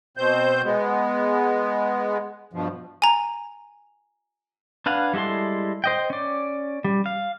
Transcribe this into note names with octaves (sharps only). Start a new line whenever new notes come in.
B2 C4 C5 G6
G#3 B3
G2 B2 F3
G#5 A#5
D4 B4 F5 F#5 G#5
G3 G#3 E4 A4 C6
C5 D#5 G5
C#4 D5
G3
F5